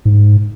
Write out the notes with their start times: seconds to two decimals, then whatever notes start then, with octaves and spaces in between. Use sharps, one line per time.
0.05 G#2